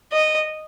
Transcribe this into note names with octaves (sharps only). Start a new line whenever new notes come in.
D#5